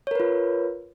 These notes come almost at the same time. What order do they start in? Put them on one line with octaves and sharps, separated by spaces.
C#5 A#4 B4 F4